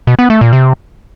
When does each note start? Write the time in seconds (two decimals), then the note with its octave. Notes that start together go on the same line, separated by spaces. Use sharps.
0.07 B2
0.19 B3
0.30 A3
0.41 A#2
0.53 C3